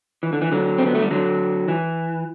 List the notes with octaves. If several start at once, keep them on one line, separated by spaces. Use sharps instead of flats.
E3
D3
E3
D3 F#3
C4
B3
A3
G3
D3 F#3
E3